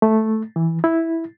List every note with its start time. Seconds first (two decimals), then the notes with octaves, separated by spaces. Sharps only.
0.02 A3
0.56 E3
0.84 E4